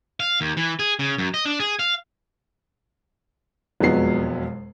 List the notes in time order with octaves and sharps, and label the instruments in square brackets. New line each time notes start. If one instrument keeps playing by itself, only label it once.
[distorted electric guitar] F5
D#2
E3
G#4
C#3
F#2
D#5
D4
G#4
F5
[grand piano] E1 F2 F#3 G#3 B3 C7